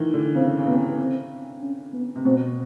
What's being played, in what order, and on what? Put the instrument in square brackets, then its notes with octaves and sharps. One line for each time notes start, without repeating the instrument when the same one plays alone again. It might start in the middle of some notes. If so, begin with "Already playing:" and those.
Already playing: [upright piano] D#3 E3
D3
[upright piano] C#3 [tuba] C4
[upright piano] C#3
[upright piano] C3 [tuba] B3
[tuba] C4
C#4
B3
[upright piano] C3
[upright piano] B2 [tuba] C4